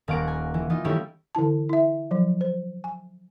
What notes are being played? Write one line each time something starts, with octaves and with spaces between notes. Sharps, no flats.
D#1 A#3 F5 F#5 C#6 D7
G#5
E3
E3 D#4 F4
D#3 G3 A3 C#4 E4 G4
D3 E3 E4 A5
E4 E5
F3 F#3
C5
G#5